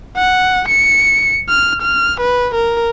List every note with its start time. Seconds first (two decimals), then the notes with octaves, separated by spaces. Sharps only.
0.18 F#5
0.69 C#7
1.50 F6
1.82 F6
2.21 B4
2.55 A#4